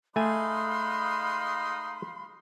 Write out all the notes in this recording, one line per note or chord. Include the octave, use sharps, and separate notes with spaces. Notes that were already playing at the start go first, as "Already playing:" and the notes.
G#3 A3 D#4 F5 G#5 B5 C6 D#6